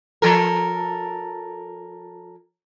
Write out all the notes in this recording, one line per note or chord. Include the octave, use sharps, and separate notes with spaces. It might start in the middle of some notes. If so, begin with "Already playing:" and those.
F3 A4 A#4